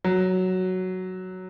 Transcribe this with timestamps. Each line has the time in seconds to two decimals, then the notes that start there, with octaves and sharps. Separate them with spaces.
0.04 F#3